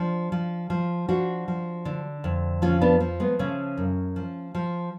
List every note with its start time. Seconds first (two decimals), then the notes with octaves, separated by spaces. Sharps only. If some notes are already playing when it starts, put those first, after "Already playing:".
Already playing: F3 D4
0.32 F3
0.70 F3
1.09 F3 D4 F#4
1.48 F3
1.85 D3
2.24 F2
2.62 F3 C#4 F4
2.81 B3 D4
3.00 F3
3.20 G#3 B3
3.39 C#3 A3 C#4
3.78 F#2
4.16 F3
4.55 F3